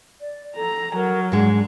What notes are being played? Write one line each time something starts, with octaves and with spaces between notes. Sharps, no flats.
D5
A4 A#5
F#3 A#4
G#2 G#3 D4